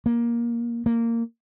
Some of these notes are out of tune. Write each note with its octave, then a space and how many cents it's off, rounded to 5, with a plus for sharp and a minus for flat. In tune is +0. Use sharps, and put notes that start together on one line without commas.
A#3 +15
A#3 -15